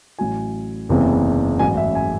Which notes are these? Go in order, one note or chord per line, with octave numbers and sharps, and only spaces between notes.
A1 A2 F#3 G#5
F#1 E2 C3 E3
A1 G#2 F#3 G#5
E5
G#5